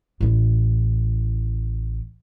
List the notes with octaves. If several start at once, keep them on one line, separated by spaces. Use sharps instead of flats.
A1 E4